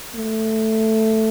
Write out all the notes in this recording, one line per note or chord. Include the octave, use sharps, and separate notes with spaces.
A3